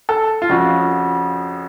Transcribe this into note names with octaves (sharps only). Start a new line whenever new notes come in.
A4
F4
F2 C#3 F3 F#4